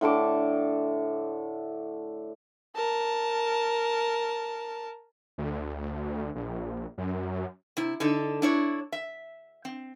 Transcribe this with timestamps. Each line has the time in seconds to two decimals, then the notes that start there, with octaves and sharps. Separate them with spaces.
0.01 A2 D3 A5 D6
2.76 A#4 A5
5.38 D2
6.35 A#1
6.98 F#2
7.77 C3 E4
8.00 D3 D#4 A4
8.42 D4 E4 C#5
8.92 E5
9.65 C4